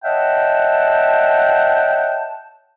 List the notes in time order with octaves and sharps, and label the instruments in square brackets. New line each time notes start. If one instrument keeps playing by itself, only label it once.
[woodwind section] C#5 D#5 E5 F#5 G5 A5